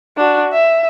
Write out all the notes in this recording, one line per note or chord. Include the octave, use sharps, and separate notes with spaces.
D4 F#4
E5